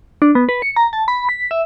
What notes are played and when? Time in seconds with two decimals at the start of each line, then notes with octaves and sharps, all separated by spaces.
0.22 D4
0.35 B3
0.49 B4
0.62 C#7
0.76 A#5
0.93 A5
1.08 B5
1.29 B6
1.51 E5